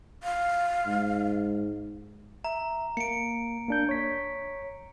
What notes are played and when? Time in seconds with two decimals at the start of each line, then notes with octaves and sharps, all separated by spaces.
0.23 F5
0.87 G#2
2.44 E5 A#5
2.97 A#3 C#7 D7
3.68 A#3 D4 G6
3.89 C#5 B6